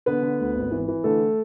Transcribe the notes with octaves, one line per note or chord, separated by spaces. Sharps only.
D3 B3 B4
D3
D2
G#1
E3
E3
D3 A3 A4